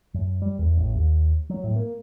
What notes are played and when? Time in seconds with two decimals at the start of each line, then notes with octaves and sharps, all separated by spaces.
0.14 F#2
0.42 G3
0.59 E2
0.77 A1
0.95 D#2
1.50 F#3
1.64 A2
1.76 A#3